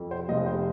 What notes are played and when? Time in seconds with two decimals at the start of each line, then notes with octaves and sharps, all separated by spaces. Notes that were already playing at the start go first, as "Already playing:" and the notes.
Already playing: F2
0.11 C5
0.29 F1 D#5
0.46 C5